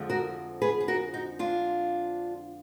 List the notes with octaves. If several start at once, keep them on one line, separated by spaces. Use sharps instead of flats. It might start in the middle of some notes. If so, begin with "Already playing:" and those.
Already playing: F2 D3 F3 G#3
F#4 A#4
G#4 B4
G#4
F#4 A#4
D#4 F#4
D4 F4